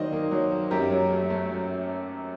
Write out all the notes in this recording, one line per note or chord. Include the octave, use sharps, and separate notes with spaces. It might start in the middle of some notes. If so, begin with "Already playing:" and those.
Already playing: D#3 F#3 A#3 C5 D5 D#5
A#3
F#3
A#3
F#2 G4 A#4
F#3
A3
A3
F#3